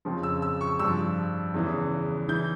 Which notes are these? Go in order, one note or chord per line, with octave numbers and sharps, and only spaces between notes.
F2 C#3 F3
E6
E6
C#6
G2 F3 E6
E2 C#3 E3
E3 G6